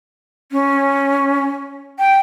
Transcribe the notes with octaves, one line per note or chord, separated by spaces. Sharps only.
C#4
G5